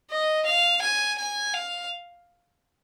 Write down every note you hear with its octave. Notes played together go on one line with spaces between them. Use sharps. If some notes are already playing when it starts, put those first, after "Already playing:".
D#5
F5
G#5
G#5
F5